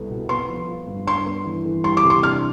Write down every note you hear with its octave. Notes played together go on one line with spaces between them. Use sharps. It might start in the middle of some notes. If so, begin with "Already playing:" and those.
Already playing: C2 B3 E4 A4
B2
B3 C6
F3
F4
G2
D4 C6
B3
E3
E3
G3 C6
D6
C3
C6
D4 F6